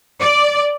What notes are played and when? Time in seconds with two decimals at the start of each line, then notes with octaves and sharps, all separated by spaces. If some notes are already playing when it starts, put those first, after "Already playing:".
0.20 D5